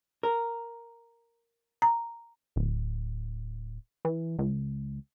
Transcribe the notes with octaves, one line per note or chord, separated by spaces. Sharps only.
A#4
A#5
D1
E3
C#2